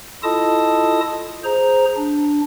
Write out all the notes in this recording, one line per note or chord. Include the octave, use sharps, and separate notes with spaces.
E4 F4 A4 D#5 A5 D#6
G#4 C5 A#5
D4